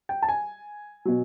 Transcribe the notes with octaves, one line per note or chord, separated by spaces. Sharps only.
G5
A5
G#5
B2 F#3